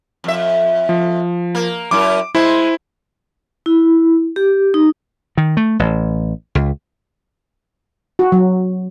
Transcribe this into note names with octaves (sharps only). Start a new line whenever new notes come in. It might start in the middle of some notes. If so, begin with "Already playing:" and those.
F2 E5
F3
A#3
F#2 E4 D6
G#3 E4 C5
E4
G4
D#4
D#3
A3
A1
C#2
F#4
F#3